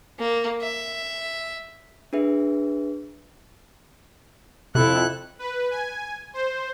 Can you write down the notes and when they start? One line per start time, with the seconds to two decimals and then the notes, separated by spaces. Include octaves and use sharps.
0.19 A#3
0.61 E5
2.13 D4 G#4 B4 E5
4.75 F2 C3 E4 A4 F#6
5.39 B4
5.70 G#5
6.34 C5